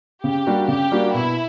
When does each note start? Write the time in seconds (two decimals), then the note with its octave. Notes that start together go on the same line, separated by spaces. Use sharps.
0.23 C#3 G4
0.47 G3 A#3 D4 F#4
0.68 C#3 G4
0.92 G3 A#3 D4 F#4
1.14 B2 E4